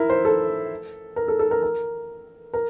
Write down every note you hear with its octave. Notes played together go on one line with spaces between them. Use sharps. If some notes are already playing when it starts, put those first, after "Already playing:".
Already playing: E4 A#4
C5
A4
A#4
A4
A4
A#4
A#4
A#4